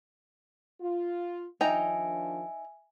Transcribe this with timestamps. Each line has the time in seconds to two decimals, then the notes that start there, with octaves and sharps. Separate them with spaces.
0.81 F4
1.61 D#3 F3 D4 D#4 E5 G5 G#5 A#5